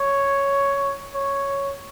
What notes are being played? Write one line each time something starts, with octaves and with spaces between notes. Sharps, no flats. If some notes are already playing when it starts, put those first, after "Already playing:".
Already playing: C#5
C#5